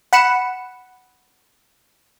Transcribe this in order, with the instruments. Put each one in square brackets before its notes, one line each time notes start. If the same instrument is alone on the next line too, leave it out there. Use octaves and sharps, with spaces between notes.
[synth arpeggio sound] F#5 B5 C#7 E7